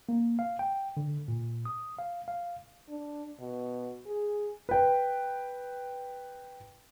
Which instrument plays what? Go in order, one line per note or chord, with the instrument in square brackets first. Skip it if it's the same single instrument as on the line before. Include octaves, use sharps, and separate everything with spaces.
[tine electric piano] A#3
F5
G5
D3
A#2
D#6
F5
F5
[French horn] D4
B2
G#4
[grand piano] B4 G5